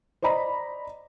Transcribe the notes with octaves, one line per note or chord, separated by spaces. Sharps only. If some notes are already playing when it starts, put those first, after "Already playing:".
C5 D5 D#5 A#5 B5